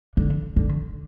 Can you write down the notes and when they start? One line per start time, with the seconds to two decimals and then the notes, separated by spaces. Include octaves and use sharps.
0.17 D3
0.56 D3